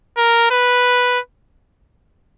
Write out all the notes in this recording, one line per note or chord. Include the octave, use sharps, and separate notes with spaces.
A#4
B4